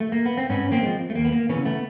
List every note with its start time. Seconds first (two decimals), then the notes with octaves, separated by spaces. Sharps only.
0.00 A3
0.12 A#3
0.26 B3
0.38 C4
0.49 G#2 B3 C#4
0.72 A#3 C4
0.83 F3 G#3
1.10 A3
1.16 D#2 A#3
1.25 B3
1.32 A#3
1.49 C#3 E3 B3 C#4
1.65 A3 B3